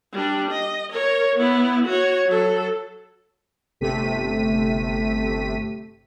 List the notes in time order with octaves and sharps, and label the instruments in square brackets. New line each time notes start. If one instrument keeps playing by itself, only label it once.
[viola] G3 D4
D#5
A#4 C#5
B3 E4
F#4 C#5
F#3 A4
[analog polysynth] G1 C3 A3 B6 D#7